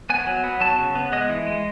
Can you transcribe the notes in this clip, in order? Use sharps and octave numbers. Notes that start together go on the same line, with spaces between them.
B3 G#5
F#3
B3
F#3 A5
C#3
B3
G#3 D#5
E3
G#3